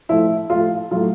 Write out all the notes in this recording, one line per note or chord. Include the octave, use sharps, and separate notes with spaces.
A2 F3 E4
A2 F3 F4
A2 F#3 F4